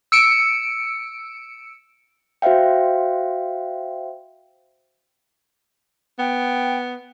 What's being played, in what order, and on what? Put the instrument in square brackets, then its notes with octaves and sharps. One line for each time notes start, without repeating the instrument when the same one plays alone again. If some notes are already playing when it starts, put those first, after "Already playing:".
[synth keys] E6 C#7 D7
[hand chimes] F#4 C5 E5 F5 G5
[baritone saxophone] B3 [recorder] G5